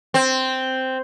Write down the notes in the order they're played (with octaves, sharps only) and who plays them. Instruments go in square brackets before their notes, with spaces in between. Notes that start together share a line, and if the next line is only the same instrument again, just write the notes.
[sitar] C4